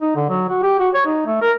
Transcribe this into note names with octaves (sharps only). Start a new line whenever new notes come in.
D#4
D3
F#3
F#4
G4
F#4
C#5
D#4
A3
A#4